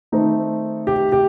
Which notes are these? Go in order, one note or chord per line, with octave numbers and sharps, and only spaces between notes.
D#3 A3 C4 D#4
G4
G4